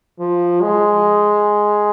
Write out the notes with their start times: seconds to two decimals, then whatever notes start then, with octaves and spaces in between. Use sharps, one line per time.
0.20 F3
0.62 G#3